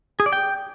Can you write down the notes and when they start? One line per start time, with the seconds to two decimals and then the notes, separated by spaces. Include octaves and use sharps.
0.20 G#4
0.26 D5
0.33 G5